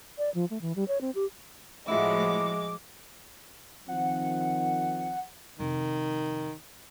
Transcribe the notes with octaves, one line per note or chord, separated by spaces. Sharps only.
D5
F3
A3
E3
G3
C#5
C4
G4
A2 F3 G#3 E4 F#4 D6
D#3 F3 C4 F#5
F2 C3 D#3